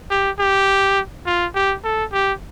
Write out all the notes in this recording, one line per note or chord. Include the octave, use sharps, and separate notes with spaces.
G4
G4
F4
G4
A4
G4